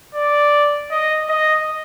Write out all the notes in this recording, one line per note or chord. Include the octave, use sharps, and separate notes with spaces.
D5
D#5
D#5